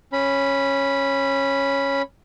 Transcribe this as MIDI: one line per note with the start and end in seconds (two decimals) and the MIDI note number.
0.13 2.02 61
0.13 2.02 83